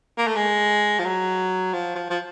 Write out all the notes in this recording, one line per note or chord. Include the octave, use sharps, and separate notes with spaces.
A#3
A3
G#3
F3
F#3
F3
F3
F3